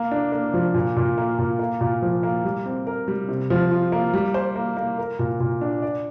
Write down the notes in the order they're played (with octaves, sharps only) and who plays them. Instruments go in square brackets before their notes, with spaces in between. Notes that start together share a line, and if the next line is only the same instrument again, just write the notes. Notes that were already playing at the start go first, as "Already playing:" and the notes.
Already playing: [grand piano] A#3
D4
A#3
F3
A#2
A#2
A#3
A#2
A#3
A#2
F3
A#3
G3
C4
A#4
G3
C3
F3
F4
A#3
G3
C5
A#3
A#3
A#4
A#2
A#2
D4
D5